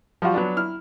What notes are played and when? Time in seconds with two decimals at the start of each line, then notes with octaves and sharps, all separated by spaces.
0.22 F3 G3 F4 F#4
0.34 F#3 B3 D4
0.57 E4 F6